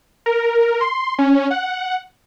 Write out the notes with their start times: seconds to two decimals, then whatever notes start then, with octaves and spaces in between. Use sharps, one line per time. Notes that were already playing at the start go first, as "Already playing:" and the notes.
0.26 A#4
0.81 C6
1.19 C#4
1.51 F#5